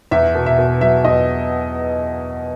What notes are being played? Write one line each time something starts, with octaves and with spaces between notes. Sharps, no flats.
E2 E5
B2
E5
B2
F#3 E5
E2 D#5